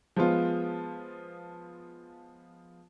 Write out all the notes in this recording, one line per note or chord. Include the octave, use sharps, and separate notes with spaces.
F3 G#3 B3 F4